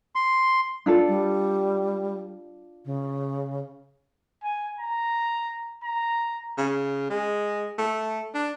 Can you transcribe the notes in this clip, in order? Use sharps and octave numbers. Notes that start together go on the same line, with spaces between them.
C6
D4 F4 A4
G3
C#3
G#5
A#5
A#5
C#3
G#3
A3
D4